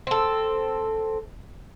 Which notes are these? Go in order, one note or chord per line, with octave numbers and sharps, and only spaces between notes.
C4 A4